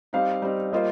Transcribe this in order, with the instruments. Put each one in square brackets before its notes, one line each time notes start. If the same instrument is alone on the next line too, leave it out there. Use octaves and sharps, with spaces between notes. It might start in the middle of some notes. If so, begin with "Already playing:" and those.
[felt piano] G3 C4 D#4 [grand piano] F5
[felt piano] G3 C4 D#4
[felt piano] G3 A#3 F4 C5 [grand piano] D#5